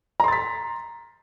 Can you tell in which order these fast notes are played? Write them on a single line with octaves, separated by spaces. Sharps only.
A#5 C6 A6 B6